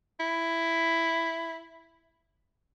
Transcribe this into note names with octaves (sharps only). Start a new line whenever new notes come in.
E4